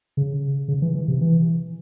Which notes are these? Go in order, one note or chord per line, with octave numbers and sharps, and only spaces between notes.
C#3
C#3
E3
E3
C3
E3